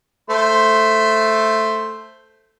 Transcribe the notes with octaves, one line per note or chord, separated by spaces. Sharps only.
A3 C5